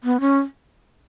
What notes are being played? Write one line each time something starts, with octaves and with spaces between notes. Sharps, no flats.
B3
C#4